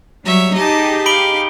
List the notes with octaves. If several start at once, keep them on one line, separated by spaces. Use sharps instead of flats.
F#3 G3 C#5 E5
D#4 G4 G#4 D#5 A5
F5 B5 D7 G7